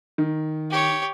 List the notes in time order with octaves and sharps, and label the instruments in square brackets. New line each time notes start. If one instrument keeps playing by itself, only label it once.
[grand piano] D#3
[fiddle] G4 C#5